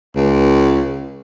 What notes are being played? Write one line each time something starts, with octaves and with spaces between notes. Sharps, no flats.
C#2